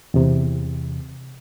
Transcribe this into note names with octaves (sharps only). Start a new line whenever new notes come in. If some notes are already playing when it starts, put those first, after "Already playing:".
E2 C3